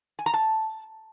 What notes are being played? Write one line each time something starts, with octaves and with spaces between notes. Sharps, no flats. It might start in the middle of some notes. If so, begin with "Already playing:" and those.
G#5
A#5
A5